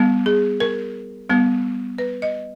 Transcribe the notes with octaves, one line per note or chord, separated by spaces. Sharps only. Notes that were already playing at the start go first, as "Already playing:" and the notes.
Already playing: G3 B3
G#4
A#4
G3 B3
B4
D#5